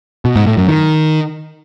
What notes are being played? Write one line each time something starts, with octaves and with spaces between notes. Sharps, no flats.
B2
G#2
A2
F#2
D#3